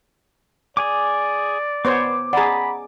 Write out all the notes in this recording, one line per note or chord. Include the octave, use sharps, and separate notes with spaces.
G#4 D5 G#5 D6
B3 C5 C#5 D6
G#4 D5 F#5 A#5 B5